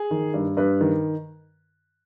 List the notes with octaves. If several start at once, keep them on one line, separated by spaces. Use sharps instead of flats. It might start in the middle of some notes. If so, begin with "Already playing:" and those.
Already playing: G#4
D#3
G2
G2 B4
D#3